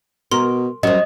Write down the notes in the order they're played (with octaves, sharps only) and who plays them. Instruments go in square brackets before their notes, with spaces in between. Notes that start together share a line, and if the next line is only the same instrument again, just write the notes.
[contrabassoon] B2 [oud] A#4 [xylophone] C6
[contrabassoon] F#2 [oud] F#3 C4 [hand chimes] D#5